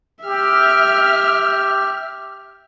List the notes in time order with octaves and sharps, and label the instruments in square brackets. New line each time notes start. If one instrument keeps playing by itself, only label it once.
[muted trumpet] G4 [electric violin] E5 F6